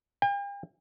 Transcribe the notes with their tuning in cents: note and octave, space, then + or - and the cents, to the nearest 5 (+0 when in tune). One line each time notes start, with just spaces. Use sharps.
G5 +45